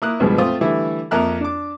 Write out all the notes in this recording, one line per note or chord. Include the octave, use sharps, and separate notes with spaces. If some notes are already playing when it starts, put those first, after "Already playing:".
A#3 E4 D#6 F#6
C#2 G2 B2 F3 G#3 B3
A3 C4 F4 D#6
D3 E3 G3 A3 E4
F2 A#3 A#4 E5 F6 F#6
D4 D6